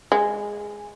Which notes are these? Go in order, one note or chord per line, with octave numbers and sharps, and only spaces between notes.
G#3